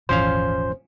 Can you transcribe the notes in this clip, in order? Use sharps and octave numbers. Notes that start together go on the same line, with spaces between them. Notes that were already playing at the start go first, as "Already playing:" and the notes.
D#1 G#1 E3 F3 C#4 C5 F5